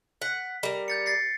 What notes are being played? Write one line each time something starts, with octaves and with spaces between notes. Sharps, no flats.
F#5 B6
G3 A#4
G6 A6 C#7
A6 A#6 C7